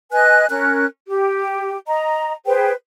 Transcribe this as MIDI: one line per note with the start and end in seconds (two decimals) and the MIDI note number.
0.12 0.46 71
0.12 0.46 75
0.12 0.46 80
0.12 0.46 90
0.49 0.85 61
0.49 0.85 70
0.49 0.85 90
1.09 1.76 67
1.87 2.32 75
1.87 2.32 82
2.46 2.71 68
2.46 2.71 71
2.46 2.71 72
2.46 2.71 79